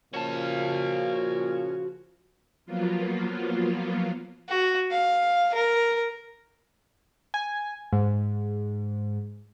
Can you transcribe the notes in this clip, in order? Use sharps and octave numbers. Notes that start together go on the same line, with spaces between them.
A#2 C#3 F3 C#4 F#4 A5
F3 F#3 A#3 B3 F4
F#4
F5
A#4
G#5
G#2